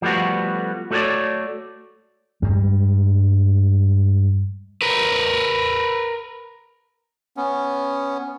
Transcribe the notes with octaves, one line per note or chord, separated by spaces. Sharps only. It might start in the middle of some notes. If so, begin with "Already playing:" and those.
F3 G3 A3 B3 F#4
A3 F#4 A4 B4 C#5 D5
G2 G3 G#3
A#4 B4
B3 C#4